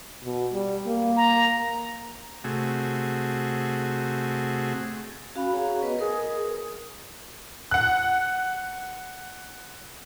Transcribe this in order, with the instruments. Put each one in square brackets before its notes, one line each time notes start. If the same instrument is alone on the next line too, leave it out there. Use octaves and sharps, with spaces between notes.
[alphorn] B2
G3
A#3
[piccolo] A#5
[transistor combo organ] C3 A3 F#4 G#4
[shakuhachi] C#4 [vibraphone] F#4 F5 B5
[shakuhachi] F#4 [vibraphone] G#4 C#5 A#5
[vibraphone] B3 B4 D#5
[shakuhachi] G#4 [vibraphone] A#4
[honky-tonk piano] F#5 F#6